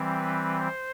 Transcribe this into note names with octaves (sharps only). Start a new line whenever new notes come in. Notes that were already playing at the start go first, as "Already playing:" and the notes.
Already playing: E3 G3 C4
B4
C5